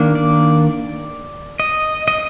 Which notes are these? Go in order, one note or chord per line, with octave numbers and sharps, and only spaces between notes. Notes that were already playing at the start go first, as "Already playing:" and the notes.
Already playing: D#3 A#3 D4
D5
D#5
D#5